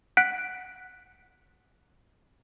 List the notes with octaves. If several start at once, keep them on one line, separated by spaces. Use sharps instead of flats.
F#5 F#6 B6 D7